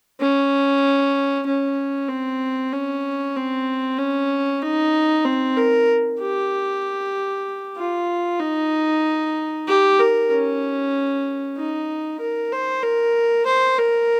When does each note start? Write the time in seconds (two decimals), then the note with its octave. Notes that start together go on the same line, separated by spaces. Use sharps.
0.20 C#4
1.46 C#4
2.09 C4
2.72 C#4
3.36 C4
3.98 C#4
4.62 D#4
5.25 C4
5.56 A#4
6.20 G4
7.77 F4
8.40 D#4
9.67 G4
9.99 A#4
10.30 C#4
11.57 D#4
12.20 A#4
12.52 C5
12.82 A#4
13.46 C5
13.78 A#4